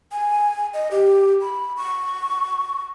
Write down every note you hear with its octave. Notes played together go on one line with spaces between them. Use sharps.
G#5
D#5
G4
B5
C#6